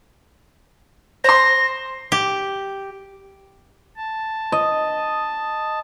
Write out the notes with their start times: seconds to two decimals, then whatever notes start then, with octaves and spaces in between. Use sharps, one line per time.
1.24 C5 C6 A#6
2.12 G4
3.97 A5
4.52 D#5